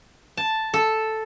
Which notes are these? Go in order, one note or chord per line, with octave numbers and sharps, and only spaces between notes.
A5
A4